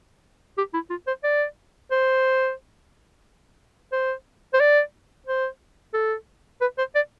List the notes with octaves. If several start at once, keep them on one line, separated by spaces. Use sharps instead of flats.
G4
E4
F4
C5
D5
C5
C5
C5
D5
C5
A4
B4
C5
D5